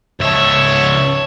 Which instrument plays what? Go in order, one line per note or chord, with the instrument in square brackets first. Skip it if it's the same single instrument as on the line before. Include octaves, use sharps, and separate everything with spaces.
[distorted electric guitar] C#2 E5 [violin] C#5 A5